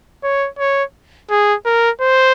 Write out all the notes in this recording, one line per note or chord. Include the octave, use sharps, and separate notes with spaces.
C#5
C#5
G#4
A#4
C5